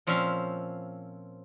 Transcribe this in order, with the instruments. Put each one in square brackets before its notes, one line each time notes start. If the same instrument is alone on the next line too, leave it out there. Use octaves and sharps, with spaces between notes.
[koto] A#2 F3 C4 C#4 E5 F5